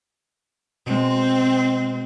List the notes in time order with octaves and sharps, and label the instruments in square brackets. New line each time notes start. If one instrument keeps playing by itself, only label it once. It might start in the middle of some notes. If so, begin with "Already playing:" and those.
[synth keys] B2 G#3 [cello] C4